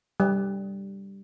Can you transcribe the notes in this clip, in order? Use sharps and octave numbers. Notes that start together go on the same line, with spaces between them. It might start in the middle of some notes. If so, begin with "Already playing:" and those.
G3